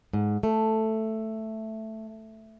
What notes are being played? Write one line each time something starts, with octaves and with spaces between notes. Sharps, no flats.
G#2
A3